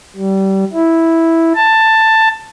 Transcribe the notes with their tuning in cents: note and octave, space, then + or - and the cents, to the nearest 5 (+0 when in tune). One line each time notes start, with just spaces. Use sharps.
G3 -25
E4 -5
A5 +10